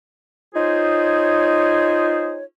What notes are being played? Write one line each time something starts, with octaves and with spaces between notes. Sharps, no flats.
D#4 F4 G#4 C5 C#5